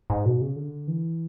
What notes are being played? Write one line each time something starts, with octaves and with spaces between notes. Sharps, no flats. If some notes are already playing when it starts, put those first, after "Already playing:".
G#2
B2
C#3
D3
E3